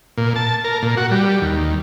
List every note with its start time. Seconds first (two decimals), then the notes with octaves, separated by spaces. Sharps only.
0.18 A#2
0.36 A5
0.64 A#4
0.83 A#2
0.97 F#4
1.11 G3
1.42 D#2